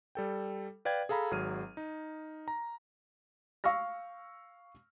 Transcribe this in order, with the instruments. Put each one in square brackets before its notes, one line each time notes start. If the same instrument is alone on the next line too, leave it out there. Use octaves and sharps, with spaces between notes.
[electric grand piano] G3 A4 G5
B4 D5 F5 G5 G#6
G#4 A4 F5 A#5 B5
G#1 F#3 G#4 F6 D#7
D#4
A#5
[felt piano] F5 C#6 E6 F6 A#6